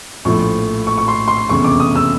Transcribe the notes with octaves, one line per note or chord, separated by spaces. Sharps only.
A#1 A2 F3 A3 C#6
C#6
C#6
C6
C6
F1 E2 C#3 C#6
D6
D#6
E6